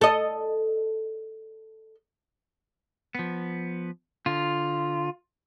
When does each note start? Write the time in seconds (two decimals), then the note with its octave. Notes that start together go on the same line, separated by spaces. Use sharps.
0.01 A4 D#5
3.15 F3 B3
4.26 D3 F4